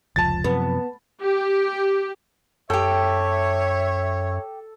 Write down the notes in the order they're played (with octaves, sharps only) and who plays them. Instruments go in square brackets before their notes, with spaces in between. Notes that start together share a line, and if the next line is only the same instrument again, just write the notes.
[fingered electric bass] F1 C#2 F3 [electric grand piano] A5 A6
[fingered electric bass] F#2 C3 F3 [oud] B3
[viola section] G4
[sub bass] F#2 [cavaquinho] G4 G5 [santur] A4 [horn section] C#5 E5